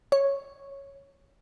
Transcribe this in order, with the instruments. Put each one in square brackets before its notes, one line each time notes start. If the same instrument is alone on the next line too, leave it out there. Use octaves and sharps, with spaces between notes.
[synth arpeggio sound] C#5